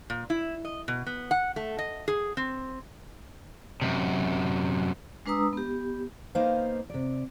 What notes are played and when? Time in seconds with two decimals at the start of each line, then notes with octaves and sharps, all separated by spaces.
0.10 A#2
0.30 E4
0.65 D#5
0.88 B2
1.06 B3
1.31 F#5
1.56 A3
1.78 D#5
2.08 G#4
2.37 C4
3.82 F#2 C3
5.26 G#3 D4 B4 A#5 D#6 E6
5.53 B3 G4
6.35 A#3 B3 D#4 C5 F5
6.90 C3 D5